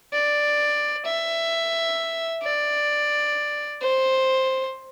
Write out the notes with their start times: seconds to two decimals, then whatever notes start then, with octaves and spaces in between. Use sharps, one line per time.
0.13 D5
1.06 E5
2.43 D5
3.82 C5